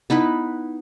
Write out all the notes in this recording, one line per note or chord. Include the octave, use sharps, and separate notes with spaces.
B3 D#4 E4 B4